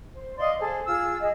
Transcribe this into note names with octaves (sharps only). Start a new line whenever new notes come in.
C5
D5 D#5 F5 C6
G#4 A4 C5
F4 G#4 E6
G#4 D#5